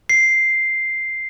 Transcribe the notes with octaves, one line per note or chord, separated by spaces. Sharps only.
C7